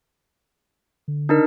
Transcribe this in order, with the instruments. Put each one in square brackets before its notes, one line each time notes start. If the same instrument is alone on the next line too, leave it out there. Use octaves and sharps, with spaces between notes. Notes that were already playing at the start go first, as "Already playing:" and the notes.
[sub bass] D3
[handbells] D4 D#4 A#4